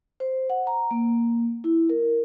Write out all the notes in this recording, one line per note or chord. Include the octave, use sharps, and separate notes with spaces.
C5
F#5
A#5
A#3
E4
A#4